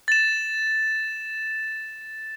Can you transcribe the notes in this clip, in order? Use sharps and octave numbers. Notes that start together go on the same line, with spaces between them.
A6 E7